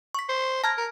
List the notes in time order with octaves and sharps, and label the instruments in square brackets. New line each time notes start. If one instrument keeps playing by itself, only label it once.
[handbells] C#6 B6
[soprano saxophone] C5
[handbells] A5 F6 G#6 [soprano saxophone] A#5
[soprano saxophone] A#4